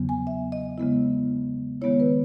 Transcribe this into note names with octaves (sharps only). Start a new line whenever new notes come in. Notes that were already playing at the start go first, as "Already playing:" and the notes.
Already playing: E2 C#3 F#3 B3
G#5
E5
D#5
C#3 G#3 B3 E4
D#3 G#3 B3 E4 C#5
B4